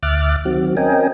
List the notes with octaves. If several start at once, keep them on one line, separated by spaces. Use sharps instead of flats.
D2 E5 D6 F6 F#6 A6
D#3 F#3 C4 F#4
C4 C#4 A#4 D#5 G5 G#5